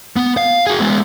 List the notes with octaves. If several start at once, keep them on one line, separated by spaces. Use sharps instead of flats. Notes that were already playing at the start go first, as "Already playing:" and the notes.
B3
F5
F#4 G#4
G#3 B3